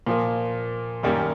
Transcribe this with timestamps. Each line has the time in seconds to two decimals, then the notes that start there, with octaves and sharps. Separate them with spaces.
0.07 A#2 F3 A#3
1.03 F#2 D#3 G3 A#3 C#4